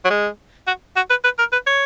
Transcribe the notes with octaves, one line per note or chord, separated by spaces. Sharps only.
F#3
G#3
F#4
F#4
B4
B4
A#4
B4
C#5